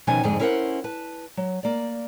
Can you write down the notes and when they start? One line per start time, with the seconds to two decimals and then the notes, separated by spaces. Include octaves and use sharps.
0.07 B2 D#3 F3 C#4 G5 G#5
0.23 F2 G#2 D3 G#3 G#4
0.39 C#4 E4 A#4 C5 F5 F#5
0.84 B4 A5
1.37 F#3
1.63 A#3 D5